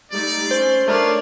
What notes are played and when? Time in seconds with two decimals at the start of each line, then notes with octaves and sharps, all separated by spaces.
0.12 G3 A3 D#4 D5
0.51 A3 C#4 C5 C6
0.88 A3 D4 F4 A#4 C#5 D5